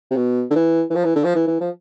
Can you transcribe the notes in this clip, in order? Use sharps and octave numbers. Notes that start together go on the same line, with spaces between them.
C3
B2
D3
E3
E3
F3
E3
D3
F3
E3
E3
F3